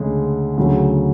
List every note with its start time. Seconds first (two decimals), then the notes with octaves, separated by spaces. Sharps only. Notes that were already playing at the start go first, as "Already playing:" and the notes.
Already playing: D2 C#3 G#3
0.57 D2 C#3 F#3